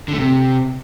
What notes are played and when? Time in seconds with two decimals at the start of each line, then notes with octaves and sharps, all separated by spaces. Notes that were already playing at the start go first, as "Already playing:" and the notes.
0.08 D3
0.13 A3
0.18 C3